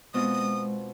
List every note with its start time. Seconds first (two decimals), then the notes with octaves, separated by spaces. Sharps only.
0.14 B2 G#3 C4 F4 D#6